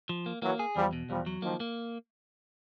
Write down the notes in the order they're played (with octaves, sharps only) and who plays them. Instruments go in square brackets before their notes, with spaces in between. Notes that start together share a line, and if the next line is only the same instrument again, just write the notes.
[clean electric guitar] F3
A#3
[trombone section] E3 F#3 [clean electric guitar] A#3
[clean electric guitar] G#4
[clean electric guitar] E2 [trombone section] F3 G3
[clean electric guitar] B2
[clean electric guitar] E2 [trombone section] F3 G3
[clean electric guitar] F#3
[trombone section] D#3 F3 [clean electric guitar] A#3
[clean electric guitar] A#3